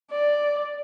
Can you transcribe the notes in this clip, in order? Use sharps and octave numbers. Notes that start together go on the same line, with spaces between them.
D5